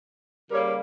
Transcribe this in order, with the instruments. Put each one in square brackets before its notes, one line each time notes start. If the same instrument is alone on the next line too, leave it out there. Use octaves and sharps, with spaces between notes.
[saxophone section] C#3 G3 A#3 A#4 C#5